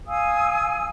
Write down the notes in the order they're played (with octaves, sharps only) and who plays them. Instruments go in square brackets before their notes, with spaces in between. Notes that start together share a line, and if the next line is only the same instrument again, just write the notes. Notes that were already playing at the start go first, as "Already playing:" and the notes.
[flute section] F5 G#5 D#6 E6